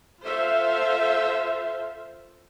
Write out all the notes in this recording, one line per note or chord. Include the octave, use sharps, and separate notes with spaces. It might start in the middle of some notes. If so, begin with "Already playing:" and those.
F4 A4 C5 E5 F5